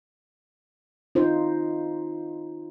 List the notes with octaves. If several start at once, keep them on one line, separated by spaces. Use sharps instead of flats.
D#4 F4 C5